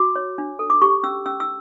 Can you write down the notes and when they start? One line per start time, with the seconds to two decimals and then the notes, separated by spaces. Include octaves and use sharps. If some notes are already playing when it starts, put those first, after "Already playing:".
Already playing: F#4 D6
0.16 C#5
0.38 D4
0.59 A4
0.70 D6
0.82 G4 C#6
1.04 C#4 E6
1.26 C#4 E6
1.40 E6